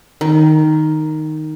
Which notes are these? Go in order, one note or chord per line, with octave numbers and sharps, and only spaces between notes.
D#3